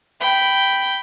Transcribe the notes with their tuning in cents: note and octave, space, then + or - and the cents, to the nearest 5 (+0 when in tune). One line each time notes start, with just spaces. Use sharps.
G5 -5 B5 +0